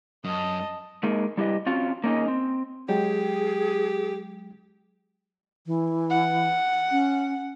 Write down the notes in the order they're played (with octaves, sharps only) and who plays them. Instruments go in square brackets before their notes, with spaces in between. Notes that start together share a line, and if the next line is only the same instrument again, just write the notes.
[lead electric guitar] F#2 [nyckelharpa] D#5 A5
[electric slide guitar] G#3 A#3 D#4 G#4 A#4
G3 E4 G4 B4 D#5
C4 C#4 F4 F#4
A#3 C#4 D#4 G#4 D#5
C4
[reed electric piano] F#3 G#3 G5 [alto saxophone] G4 [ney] G#4
[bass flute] E3
[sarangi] F#5
[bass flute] C#4